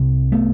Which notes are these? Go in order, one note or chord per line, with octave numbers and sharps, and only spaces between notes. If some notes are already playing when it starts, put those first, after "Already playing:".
Already playing: C2 C3
A3 B3